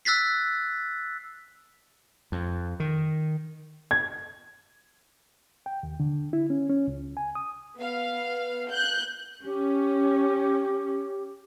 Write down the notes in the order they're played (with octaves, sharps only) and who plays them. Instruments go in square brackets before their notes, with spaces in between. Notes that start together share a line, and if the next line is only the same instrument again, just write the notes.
[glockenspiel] E6 F#6 A6 B6 C7
[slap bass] F2
D#3
[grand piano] G#6
[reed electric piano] G5
D#2
D3
E4
C#4
C#4
C#2
G#5
D#6
[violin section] B3 F5
F#6 G6
[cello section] C#4 [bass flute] G4